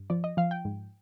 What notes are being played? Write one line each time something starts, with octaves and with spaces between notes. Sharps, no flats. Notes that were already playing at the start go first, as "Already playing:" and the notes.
Already playing: G2
F3 D5
D#5
F3 F5
G5
G#2